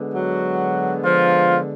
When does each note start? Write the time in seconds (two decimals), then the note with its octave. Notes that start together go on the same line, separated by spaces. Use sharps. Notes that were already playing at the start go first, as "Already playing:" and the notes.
Already playing: D3 G#3 B3
0.14 F#3 F#4
1.04 F3 F4